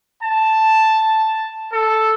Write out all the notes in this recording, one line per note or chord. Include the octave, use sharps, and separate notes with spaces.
A5
A4